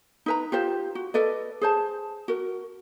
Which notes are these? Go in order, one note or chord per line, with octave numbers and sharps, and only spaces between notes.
D#4 B4 A#5
F4 G4 C5
F#4
A4 B4 D5 D#5
G#4 C5 A5
F#4 A#4